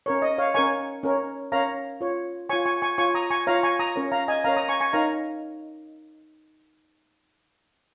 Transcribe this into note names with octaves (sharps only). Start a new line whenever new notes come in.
C#4 A#4 C#5
D#5
C#5 F5
C#4 A#4 C#5 G#5 C#6
C#4 A#4 C#5
C#4 A#4 C#5 F5 A#5
F4 C#5
F4 C#5 G#5 C#6
G#5 C#6
G#5 C#6
F4 C#5 G#5 C#6
A#5 D#6
G#5 C#6
F4 C#5 F5 A#5
G#5 C#6
A#5 D#6
C#4 A#4 C#5
F5 A#5
D#5 G#5
C#4 A#4 C#5 F5 A#5
A#5 D#6
G#5 C#6
G#5 C#6
D#4 A#4 C#5 F5 A#5